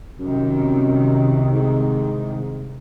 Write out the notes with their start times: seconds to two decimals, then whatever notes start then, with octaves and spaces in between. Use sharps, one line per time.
0.19 C2 F#2 C3 D#3
1.52 G#2